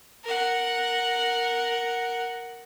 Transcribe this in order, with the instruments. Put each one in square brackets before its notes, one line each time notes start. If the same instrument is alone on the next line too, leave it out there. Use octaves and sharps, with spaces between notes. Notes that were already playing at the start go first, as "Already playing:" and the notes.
[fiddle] A#4 F#5